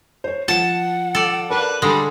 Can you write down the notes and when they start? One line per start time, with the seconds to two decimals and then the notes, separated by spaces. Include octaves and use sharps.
0.24 C5 C#5
0.48 F3 F#5 A5
1.15 A4 D5
1.51 D4 A#4 B4
1.82 D3 G3 G#3 A4